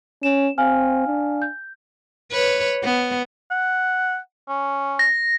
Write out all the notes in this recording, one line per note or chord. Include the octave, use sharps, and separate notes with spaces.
C#4 E7
C4 F5 G#5 F6
D4
G6
B4 C#5
B3
F#5
C#4
A#6